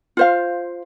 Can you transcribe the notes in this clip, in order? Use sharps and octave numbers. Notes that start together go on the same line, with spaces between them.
F4 C5 F5